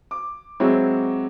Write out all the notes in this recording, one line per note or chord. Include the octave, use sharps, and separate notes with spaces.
D6
F#3 G#3 C4 E4 F#4